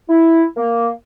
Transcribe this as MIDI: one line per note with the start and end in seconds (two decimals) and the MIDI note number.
0.09 0.42 64
0.56 0.88 58